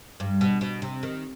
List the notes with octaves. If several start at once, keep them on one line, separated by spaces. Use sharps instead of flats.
G2
B2
B2
C3
D#3